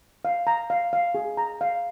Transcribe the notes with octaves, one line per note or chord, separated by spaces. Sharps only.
F5
A#5
F5
F5
G#4
A#5
F5